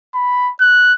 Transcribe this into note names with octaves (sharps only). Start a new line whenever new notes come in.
B5
F#6